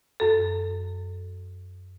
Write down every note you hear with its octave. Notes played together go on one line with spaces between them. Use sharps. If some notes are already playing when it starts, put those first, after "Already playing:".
F#2 A4